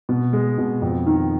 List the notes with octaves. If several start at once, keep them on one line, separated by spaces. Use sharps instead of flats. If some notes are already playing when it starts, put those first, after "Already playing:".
B2
G#3
B2
F2
D#3